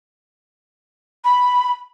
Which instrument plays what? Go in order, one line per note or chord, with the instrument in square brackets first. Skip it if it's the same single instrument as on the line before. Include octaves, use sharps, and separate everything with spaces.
[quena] B5